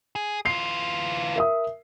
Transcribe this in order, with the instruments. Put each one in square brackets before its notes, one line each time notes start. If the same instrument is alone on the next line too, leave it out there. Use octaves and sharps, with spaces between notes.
[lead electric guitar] G#4
[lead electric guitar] E3 F4 [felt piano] C7
[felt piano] A#4 E5 D#6